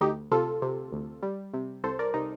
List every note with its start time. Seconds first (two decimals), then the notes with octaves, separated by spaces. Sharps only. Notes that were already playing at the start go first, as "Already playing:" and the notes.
0.01 D2 D#4 G4
0.32 C3 F4 A4
0.62 C3
0.93 D2
1.23 G3
1.54 C3
1.84 C2 A4 C5
1.99 A#4 D5
2.14 C3 D#4